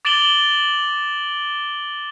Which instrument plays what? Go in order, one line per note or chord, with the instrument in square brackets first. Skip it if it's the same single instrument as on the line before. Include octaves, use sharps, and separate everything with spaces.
[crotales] D6 A6 D7 E7 F#7 G7